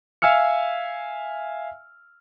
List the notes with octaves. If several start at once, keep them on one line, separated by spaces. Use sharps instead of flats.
E5 F5 G#5 E6 F6 C#7